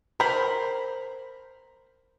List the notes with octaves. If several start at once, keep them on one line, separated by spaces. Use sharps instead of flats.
A#4 C5 B5